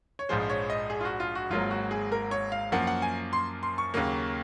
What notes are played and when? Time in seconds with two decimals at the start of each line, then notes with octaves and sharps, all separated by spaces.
0.19 C#5
0.29 A#1 G#2 F3 G#3 C5
0.49 C#5
0.70 D#5
0.90 G#4
1.01 F4
1.05 F#4
1.20 F4
1.35 F#4
1.50 G#1 G#2 F#3 A#3 F4
1.71 F#4
1.91 G#4
2.12 A#4
2.31 C#5
2.52 F5
2.72 F#2 F3 A#3 F#5
2.87 F#5
3.02 G#5
3.33 C6
3.63 C6
3.78 C#6
3.94 D#2 C#3 F#3 A#3